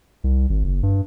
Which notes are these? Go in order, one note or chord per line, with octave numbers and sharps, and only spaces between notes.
C2
G#1
F#1
G2